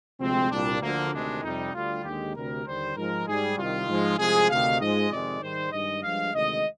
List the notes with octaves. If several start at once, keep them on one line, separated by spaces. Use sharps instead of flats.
D2 C3 F3 G#3 C4
C2 A#2 G3 D4
D2 D3 F3 A#3
D2 C3 D#3 G#3 D4
F2 C3 G3 D#4
D2 D3 G3 F4
D#2 D3 G#3 G4
D2 C3 G3 A#4
D#2 D3 G3 C5
G#2 F3 G#3 A#4
G#2 G3 G#4
C2 C3 D#3 F4
G#2 F3 G#3
C2 C3 F3 G#3 G#4
D2 C3 D#3 F5
G#2 F3 G#3 D#5
F2 C3 D#3 G#3 D5
G#2 D#3 G3 C5
G2 D#3 G#3 D#5
G2 F3 G#3 F5
D2 C3 D#3 G#3 D#5